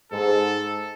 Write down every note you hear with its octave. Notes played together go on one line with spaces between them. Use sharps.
G#2 A4